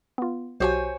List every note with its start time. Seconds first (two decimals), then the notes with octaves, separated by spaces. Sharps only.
0.18 B3 F4
0.60 B1 F#4 G4 C5 C#5 G#5